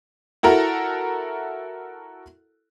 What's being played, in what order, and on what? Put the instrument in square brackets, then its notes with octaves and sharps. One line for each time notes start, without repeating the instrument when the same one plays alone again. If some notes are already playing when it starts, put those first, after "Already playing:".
[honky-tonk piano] E4 F#4 A4 A#4